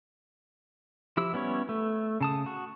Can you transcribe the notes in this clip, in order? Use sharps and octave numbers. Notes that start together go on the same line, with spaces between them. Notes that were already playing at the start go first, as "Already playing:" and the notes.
F3 E4 G4 E6
G3 B3 C#4 E4 C#5
A3
C#3 A5 D#6
F#4